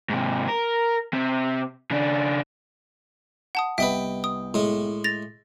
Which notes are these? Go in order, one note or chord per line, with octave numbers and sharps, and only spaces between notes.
G#2 C3
A#4
C3
C#3 D4
F#5 A5 D#6
C2 B3 B4 D#5 E5 G5 D6
D#6
A2 G#3
A6 A#6 F7